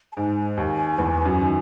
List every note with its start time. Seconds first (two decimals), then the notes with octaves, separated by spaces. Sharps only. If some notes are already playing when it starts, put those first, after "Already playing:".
0.12 A5
0.17 G#2 G#5
0.57 D#2 D#3
0.98 E2 E3
1.25 F#2 F#3
1.41 D#3